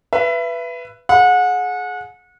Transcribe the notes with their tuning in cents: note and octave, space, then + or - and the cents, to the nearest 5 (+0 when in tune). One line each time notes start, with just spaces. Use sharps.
B4 +0 E5 +30
G#4 +30 F#5 -30